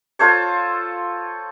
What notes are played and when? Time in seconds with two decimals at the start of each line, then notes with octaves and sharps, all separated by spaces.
0.19 F4 A4 C5 C#5